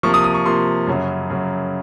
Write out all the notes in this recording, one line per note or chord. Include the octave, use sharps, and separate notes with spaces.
C3 F3 A#3 C#6
D#6
D#6
C#6
C3 F3 A#3 C6
F#2 C#3 F#3
F#2 C#3 F#3